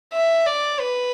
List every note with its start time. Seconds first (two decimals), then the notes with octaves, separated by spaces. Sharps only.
0.13 E5
0.46 D5
0.79 B4